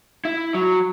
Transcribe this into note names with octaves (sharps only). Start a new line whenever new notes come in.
E4
F#3